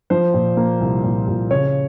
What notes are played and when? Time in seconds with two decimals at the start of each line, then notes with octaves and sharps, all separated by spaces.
0.10 F3 C5
0.34 A#2
0.57 A#3
0.81 C2
1.04 A#2
1.28 A#2
1.51 C#3 C#5